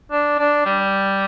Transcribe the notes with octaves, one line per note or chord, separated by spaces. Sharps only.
D4
D4
G3